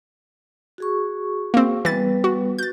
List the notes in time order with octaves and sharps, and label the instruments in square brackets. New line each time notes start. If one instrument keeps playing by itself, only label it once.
[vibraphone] F#4 G#4 C#6
[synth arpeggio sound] A#3 C4
[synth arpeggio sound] E3 A6 [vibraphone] G3 B3 B4
[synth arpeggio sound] F#4
[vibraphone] F#4 [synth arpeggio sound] G6 A6